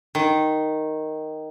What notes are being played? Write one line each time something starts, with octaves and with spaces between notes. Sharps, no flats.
D#3